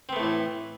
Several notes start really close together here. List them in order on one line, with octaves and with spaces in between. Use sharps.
C4 B3 A3 A2 E3